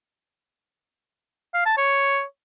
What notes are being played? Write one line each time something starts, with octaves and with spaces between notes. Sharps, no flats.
F5
A5
C#5